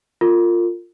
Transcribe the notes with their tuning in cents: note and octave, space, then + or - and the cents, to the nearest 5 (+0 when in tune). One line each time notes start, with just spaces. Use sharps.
F4 +0 A#4 -35